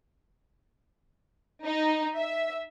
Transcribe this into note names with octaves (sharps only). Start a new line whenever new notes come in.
D#4
E5